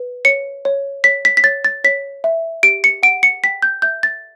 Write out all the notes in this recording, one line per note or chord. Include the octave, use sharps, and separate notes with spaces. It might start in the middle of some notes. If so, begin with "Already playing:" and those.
Already playing: B4
C#5 C#7
C#5
C#5 B6
B6
B6
C#5 A6
A6
C#5 B6
E5
G4 D7
C#7
F#5 D7
C#7
G5 B6
G6
E5 G6
A6